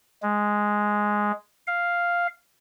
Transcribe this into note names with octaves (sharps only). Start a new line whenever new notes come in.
G#3
F5